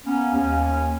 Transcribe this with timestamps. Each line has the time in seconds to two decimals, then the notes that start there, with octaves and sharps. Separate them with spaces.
0.06 A#3 B3 C#4
0.33 D#2 C#4